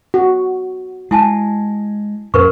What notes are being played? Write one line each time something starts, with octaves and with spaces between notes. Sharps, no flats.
F#4
G#3 E4 G#5 A5
F2 A#2 C#4 A#4 B4 C#6